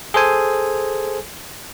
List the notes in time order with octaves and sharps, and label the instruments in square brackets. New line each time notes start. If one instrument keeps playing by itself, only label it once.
[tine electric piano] G#4 A4 C5 G#5